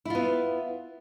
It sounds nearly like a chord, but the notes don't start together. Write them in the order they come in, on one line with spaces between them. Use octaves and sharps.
E4 F4 B3